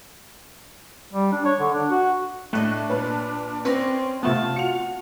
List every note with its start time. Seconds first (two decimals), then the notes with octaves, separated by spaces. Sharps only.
1.14 G3
1.32 D4
1.45 C#5
1.60 D3
1.74 D4
1.90 F#4
2.53 A2 A3 D4 D#5 F#6
2.90 A#2 B4
3.65 C4 C#4 B4 D5 C6 A#6
4.23 C3 A3 B3 F4 A5
4.56 F#4 C#7 F7